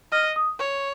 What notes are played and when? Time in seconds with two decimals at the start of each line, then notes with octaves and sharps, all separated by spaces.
0.12 D#5 F6
0.36 D#6
0.59 C#5 C#6